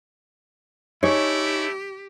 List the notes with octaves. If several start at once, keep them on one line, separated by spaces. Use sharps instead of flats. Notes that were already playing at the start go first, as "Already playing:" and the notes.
A3 D#4 E4 G4 G#4 C#5